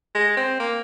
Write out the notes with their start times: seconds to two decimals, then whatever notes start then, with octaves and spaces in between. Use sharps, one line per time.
0.15 G#3
0.37 C4
0.59 A#3